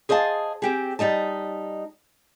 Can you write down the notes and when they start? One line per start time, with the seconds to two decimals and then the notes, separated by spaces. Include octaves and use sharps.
0.09 G#4 C5 D#5 F5 A5
0.62 C4 G4 G#4
0.99 G3 D#4 D#5 A5